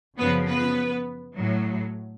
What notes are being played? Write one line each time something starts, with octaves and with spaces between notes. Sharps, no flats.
F#2 C#3 F3 B3 B4
B3 B4
A2 F#3